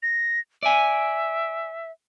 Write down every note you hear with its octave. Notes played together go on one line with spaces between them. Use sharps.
A#6
D5 E5 G#5